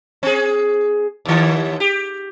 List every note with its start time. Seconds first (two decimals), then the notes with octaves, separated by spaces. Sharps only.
0.23 C4 G#4
1.26 D#2 D#3
1.80 G4